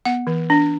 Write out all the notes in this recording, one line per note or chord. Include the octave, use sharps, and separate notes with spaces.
B3 F#5
E3
D4